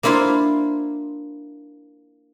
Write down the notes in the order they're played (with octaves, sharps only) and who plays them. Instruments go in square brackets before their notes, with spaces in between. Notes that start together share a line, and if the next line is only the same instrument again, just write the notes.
[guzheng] A#3 D4 E4 F4 C5